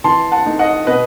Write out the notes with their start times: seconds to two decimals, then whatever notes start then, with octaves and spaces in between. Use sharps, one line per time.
0.04 E3 A5 C6
0.32 F#5 A5
0.45 A3 D#4
0.59 D#5 F#5
0.86 B2 B4 D#5